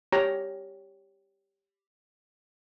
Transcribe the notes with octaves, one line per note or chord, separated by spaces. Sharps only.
G4 C#5 A#5